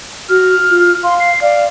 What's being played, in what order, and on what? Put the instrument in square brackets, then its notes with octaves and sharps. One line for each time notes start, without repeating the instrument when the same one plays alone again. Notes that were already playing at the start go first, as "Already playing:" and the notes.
[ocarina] F#4 [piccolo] F6
[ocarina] F4
[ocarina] F5 [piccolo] C6
[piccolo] C7
[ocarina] D5 [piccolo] F5